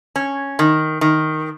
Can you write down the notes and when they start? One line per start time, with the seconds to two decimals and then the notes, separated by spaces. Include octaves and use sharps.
0.16 C#4
0.59 D#3
1.01 D#3